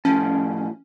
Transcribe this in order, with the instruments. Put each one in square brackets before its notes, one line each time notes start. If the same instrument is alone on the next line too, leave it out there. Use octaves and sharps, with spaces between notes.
[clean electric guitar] A2 F3 A5 [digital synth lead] C#4